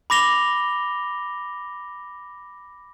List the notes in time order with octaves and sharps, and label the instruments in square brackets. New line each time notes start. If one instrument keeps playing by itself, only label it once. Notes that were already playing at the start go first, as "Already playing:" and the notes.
[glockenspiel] B5 D6 A#6 F7 G7